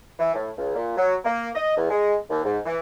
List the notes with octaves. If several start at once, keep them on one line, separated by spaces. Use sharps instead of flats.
E3
A2
C#2
A#2
F#3
A#3
D#5
E2
G#3
D#2
G#2
E3